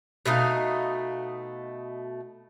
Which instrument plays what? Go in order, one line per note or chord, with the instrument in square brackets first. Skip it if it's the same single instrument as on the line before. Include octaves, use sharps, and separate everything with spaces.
[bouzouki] B2 A3 D#4 F5